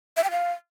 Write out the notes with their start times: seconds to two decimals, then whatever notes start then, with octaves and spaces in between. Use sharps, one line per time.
0.17 E5
0.24 G5
0.31 F5